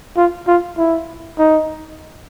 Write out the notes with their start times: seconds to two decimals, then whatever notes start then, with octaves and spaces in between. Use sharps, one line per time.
0.17 F4
0.47 F4
0.77 E4
1.39 D#4